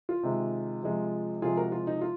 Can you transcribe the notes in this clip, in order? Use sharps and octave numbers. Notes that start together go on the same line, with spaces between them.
F4
C3 D#3 G#3
C3 F3 G#3
C3 F3 G#3 F4 G#4
F#4 A#4
F4
D#4
F4